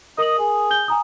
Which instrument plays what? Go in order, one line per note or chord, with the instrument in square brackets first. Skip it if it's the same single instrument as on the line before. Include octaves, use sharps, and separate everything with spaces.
[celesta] A#4 D#6 F#7 [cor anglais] D#5
[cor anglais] G#4
[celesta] G6 G7
G#5 A#5 D#6